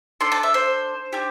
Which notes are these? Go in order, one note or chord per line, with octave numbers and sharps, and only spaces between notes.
D4 A4 C6
A5
E5
C5
D4 G4